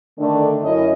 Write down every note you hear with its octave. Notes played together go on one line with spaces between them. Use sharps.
D3 D#3 A3 D4
F#2 C#4 E4 D#5